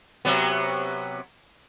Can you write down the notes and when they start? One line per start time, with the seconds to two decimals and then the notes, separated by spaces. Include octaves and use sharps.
0.25 C3 F#3 B3